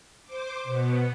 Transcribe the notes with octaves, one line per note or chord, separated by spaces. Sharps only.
C5 D6
B2 B3